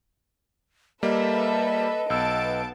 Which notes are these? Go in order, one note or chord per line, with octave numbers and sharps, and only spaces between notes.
G3 A#3 A4 B4 D#5 E5
B1 B3 A5 E6 D7